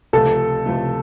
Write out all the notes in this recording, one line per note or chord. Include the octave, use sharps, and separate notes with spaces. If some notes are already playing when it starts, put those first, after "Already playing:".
C#2 C3 F3 A3 A4
C#2 C3 F3 A3